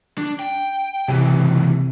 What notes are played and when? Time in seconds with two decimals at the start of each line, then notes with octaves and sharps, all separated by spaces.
0.18 D4
0.40 G5
1.08 C#2 C3 E3